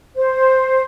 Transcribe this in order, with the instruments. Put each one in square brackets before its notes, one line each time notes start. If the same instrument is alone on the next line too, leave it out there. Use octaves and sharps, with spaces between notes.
[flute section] C5